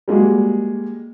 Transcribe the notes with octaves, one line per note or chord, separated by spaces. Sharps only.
G3 G#3 A#3 F#4